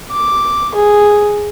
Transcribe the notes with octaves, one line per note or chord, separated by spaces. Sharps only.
D6
G#4